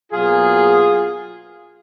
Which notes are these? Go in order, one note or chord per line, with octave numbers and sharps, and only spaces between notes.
B2 F#3 A#3 F4 G#4